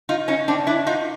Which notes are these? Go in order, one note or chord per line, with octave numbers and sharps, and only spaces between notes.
D#4 F4
C#4 D#4
C4 D4
D4 E4
D#4 F4